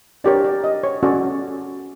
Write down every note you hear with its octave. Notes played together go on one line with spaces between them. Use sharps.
D4 G4 A#4 C#5 D5
D5
D#5
C#5
C#4 F#4 A4 D5